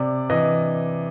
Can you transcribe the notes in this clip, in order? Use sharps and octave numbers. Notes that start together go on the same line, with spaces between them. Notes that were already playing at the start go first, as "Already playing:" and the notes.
Already playing: C3 D5
E3 D#5